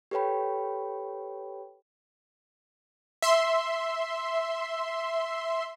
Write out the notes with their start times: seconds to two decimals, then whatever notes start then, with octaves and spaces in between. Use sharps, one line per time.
0.11 G4 A4 B4 C#5 G5 B5
3.22 E5 C6